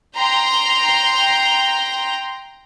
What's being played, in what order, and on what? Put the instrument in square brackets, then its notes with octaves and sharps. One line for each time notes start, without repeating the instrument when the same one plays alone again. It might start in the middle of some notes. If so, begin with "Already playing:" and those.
[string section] G5 A#5 C6